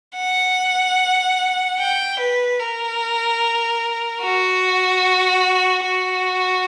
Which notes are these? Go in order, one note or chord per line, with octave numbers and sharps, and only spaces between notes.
F#5
G5
B4
A#4
F#4
F#4